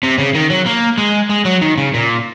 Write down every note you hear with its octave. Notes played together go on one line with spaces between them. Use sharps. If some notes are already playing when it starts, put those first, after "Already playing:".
C3
C#3
D#3
F#3
A#3
G#3
G#3
F#3
D#3
C#3
A#2